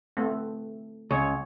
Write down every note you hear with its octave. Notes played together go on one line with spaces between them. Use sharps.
A3 B3 C4
C#2 C#5